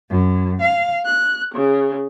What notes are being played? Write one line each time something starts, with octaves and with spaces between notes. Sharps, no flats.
F#2
F5
F#6
C#3